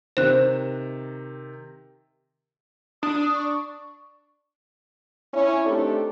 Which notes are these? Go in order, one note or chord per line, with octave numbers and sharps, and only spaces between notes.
C3 D#3 C5 F#6 E7
D4 D#6
C#6
C#4 E4
A3 C4 D4 D#4 G4 A4